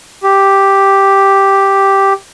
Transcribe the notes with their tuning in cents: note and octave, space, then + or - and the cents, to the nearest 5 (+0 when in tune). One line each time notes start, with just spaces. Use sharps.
G4 +0